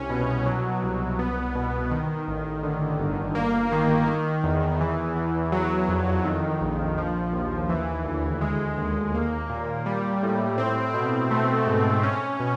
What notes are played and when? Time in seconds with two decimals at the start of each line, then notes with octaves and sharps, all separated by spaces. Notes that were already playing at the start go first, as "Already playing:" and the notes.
Already playing: C2 C#4
0.10 B2
0.46 F#3
0.83 C2
1.19 B3
1.55 B2
1.91 D#3
2.28 A1
2.63 D3
2.99 G1
3.35 A#3
3.72 D#3
4.07 D#3
4.44 E2
4.81 E3
5.16 E2
5.52 F#3
5.89 F2
6.25 D#3
6.61 A#1
6.98 F3
7.33 D#2
7.69 E3
8.05 D2
8.41 G#3
8.78 D#2
9.14 A#3
9.50 A#2
9.86 G3
10.23 A2
10.58 C4
10.94 B2
11.31 A3
11.67 G#2
12.03 C#4
12.40 B2